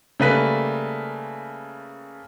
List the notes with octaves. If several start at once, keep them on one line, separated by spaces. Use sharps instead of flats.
C#3 G3 A3 A#3 B4 B6